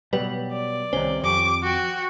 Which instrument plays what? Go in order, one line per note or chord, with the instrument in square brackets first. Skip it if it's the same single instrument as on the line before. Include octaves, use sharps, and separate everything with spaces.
[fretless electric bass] B2 F#3 G3 [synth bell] B4
[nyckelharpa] D5
[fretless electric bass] C2 C3 C#4 [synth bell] D#3 C5
[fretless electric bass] F2 [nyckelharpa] G4 C#6 [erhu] D6
[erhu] F#4 [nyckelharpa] G5